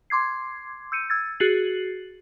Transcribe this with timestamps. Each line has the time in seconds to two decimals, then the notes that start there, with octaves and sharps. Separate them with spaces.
0.10 C6 D6 G#6 C7
0.92 E6 G6 C#7 D#7
1.10 E6 G#6 A6
1.40 F#4 G#4 A6 C7 F#7